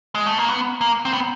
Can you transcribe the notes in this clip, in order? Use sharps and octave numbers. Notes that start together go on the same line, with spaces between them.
G#3
A3
A#3
B3
A#3
C4
B3